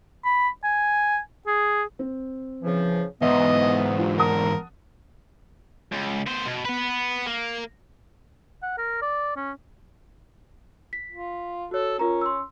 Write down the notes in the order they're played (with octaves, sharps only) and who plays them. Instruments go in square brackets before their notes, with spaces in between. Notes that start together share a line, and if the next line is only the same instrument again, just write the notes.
[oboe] B5
G#5
G#4
[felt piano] C4
[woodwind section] C#3 E3 F3
[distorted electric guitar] E2 G#2 [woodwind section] E3 B3 [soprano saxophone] D#5 [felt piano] E5
[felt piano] D4 F4 G4
[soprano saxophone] A#4 [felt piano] F#5 A5 D#6
[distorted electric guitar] C#2
B3 C5
B2
B3 B4
A#3
[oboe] F#5
A#4
D5
C#4
[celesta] B6
[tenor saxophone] F4
[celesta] F#4 C#5 [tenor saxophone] A4
[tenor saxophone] C#4 [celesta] F4 A#4 A#5
[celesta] C6 E6